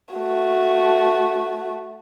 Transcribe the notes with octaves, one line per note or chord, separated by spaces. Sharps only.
A3 F#4